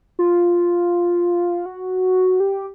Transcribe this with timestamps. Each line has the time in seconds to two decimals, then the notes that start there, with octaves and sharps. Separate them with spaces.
0.19 F4
1.66 F#4
2.40 G4